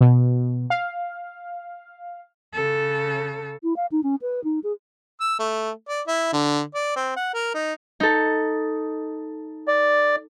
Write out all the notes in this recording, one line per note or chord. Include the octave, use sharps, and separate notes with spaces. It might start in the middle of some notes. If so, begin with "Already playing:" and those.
B2
F5
C#3 A4
E4
F5
D#4
C#4
B4
D#4
G#4
E6
A3
D5
E4
D3
D5
C4
F#5
A#4
D#4
D#4 A4
D5